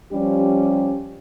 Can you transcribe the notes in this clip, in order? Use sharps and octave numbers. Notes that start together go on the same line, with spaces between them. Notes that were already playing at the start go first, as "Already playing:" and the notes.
F3 G3 C#4 G4